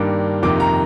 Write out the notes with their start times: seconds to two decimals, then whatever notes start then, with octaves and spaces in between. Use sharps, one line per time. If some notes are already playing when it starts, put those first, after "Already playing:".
Already playing: G2 D#3 A#3 D4
0.43 F2 C3 D#3 A#3 D6
0.60 A#5